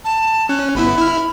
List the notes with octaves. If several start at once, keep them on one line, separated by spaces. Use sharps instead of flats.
A5
C#4 F#6
G1 B3 E4 B5
E4 F6